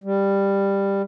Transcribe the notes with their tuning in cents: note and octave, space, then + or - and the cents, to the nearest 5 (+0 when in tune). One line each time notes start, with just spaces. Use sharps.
G3 +10